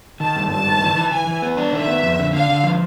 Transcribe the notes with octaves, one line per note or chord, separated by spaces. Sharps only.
D#3 A5
G2
G2 A5
D#3
E3
E3
E3 G#5
E3
B3
D4
D#3 E5
B3
F2
D3
D3 F5
D3
F3